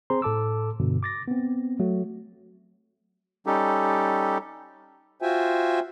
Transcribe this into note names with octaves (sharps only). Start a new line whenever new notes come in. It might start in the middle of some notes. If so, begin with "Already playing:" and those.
C4 G#4 C5 A#5 C6
A2 A4 A5 D6 E6
G2 B2 D3
D6 A6 A#6
B3 C4
F#3 A3 F#4
G3 C#4 D#4 G4 A4
F4 F#4 C5 E5 G5 G#5